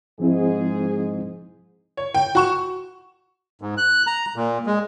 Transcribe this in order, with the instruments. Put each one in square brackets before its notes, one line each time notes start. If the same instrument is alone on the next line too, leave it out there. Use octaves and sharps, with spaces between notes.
[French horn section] G#2 G#4 [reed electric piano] F3 C4 E4
[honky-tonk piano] C#5
G5
F#4 C#6 E7
[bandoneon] G#2
F#6
A#5
A#2
G#3